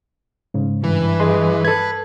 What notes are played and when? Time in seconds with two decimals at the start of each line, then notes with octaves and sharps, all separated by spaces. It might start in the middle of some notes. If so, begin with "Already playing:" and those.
0.54 G#2 C#3
0.84 G2 E3 B4
1.20 G#4 D#5 C6
1.65 A4 B4 G#6